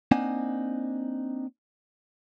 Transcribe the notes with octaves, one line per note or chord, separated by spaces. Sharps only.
A#3 C4 D4 D#4 F#5 G#5